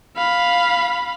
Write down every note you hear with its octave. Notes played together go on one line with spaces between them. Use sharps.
F5 B5